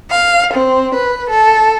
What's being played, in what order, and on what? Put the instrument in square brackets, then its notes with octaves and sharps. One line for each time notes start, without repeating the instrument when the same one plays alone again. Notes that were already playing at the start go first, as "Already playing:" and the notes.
[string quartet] F5
C4
B4
A4